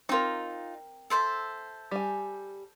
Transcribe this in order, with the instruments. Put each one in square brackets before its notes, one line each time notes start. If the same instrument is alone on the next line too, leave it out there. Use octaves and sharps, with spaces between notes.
[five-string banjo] C4 A#4 [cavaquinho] D#4 F4
[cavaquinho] A4 C5 E5
[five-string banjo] G3 G#5